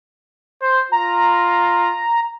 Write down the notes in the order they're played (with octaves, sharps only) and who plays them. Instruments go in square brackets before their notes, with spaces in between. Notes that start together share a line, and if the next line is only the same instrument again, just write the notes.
[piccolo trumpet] C5
[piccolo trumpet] F4 [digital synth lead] A#5